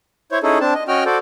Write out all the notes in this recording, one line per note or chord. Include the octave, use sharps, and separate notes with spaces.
E4 C5 C#5
C#4 D#4 E4 G#4 A4
C4 D4 A5
D#5
C#4 F#4 D#5 G5 F6
F#4 A4 C5 D5